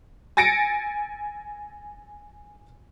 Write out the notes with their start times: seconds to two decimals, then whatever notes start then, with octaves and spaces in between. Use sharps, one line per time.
0.37 G#5 A6 A#6 C#7 D7